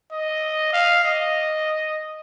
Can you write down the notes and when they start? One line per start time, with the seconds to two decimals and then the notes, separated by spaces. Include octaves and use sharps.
0.12 D#5
0.73 F5
1.04 D#5